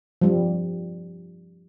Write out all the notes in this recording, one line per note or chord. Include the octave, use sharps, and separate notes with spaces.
F3 G3